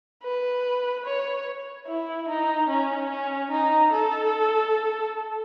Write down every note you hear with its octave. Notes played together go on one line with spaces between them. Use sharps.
B4
C#5
E4
D#4
C#4
C#4
D#4
A4